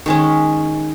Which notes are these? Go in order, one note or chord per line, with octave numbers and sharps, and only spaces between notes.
D#3 G#3 C#4